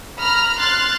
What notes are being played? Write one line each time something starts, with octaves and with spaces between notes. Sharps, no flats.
A#5 B5 F6
C6 F6 F#6 A6